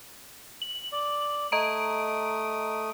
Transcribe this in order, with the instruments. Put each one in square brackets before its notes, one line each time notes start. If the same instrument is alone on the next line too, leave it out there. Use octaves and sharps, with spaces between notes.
[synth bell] F#7
[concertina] D5
[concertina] A3 D#6 [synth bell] D#5 A#5 D7